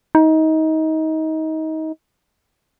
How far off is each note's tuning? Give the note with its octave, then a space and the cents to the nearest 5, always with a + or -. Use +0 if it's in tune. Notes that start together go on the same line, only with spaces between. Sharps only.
D#4 +25